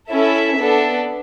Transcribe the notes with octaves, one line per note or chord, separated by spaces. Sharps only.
C#4 E4 A4 E5
B3 D4 A4